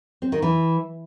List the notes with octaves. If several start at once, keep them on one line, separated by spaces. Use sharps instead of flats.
C4
D#3
E3